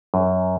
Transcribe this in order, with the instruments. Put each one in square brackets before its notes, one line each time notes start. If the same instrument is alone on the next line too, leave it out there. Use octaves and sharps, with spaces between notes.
[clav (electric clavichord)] F#2